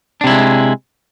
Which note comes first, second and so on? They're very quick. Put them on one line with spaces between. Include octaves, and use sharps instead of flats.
D4 C3 E4 G#3